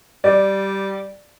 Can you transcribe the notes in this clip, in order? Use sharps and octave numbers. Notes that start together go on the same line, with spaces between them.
G3 D5